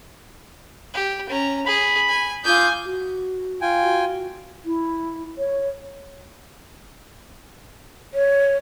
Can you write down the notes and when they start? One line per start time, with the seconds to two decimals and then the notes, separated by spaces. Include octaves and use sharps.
0.94 G4
1.29 C#4 A#5
1.66 G#4 B5
2.09 G#5
2.45 F4 G#5 D6 D#6 G6
2.85 F#4
3.61 F4 G5 G#5
3.83 F#4
4.65 E4
5.38 C#5
8.14 C#5